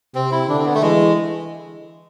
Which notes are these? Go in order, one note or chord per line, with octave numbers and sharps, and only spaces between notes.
C3 C4
E4
D3 D4
C4
B3
A3
E3 G#3